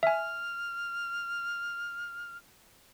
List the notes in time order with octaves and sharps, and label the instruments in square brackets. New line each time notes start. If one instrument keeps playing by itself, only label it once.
[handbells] E5 G#5 [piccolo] F6